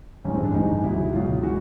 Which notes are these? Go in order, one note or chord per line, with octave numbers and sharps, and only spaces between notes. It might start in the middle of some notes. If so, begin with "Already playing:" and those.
A1 G2 E3 G#3 C#4
C4
D4
A1 G2 E3 G#3 D#4
C#2 B2 F#3 E4
C#2 B2 F#3 F4
E3 F#4